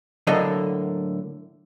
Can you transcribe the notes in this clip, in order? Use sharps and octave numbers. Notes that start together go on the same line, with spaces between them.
A2 D3 F#3 A#3 A4 D#5